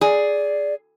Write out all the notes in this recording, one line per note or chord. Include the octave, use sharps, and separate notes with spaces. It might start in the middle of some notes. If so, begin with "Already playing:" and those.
G#4 D5